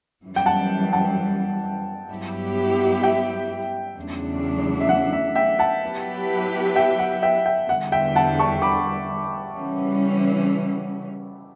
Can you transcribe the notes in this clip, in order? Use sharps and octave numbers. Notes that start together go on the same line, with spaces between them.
F#2 E3 G3
G5
F#5 A5
F#5 A5
G2 F#3 B3 E4 G4
E5 G5
E2 C#3 F#3 A3 D4
E5
F#5
E5
E5 G5
F#5 A5
F#3 B3 E4 G4 B4
E5 G5
F#5
E5 G5
E5 G5
E2 D3 G3 F#5
E5 G5
F#5 A5
A5 C#6
B5 D6
C#3 E3 G3 C#4